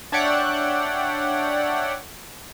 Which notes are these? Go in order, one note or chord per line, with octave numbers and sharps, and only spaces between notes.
D4 C#5 D5 E5 F#5 G5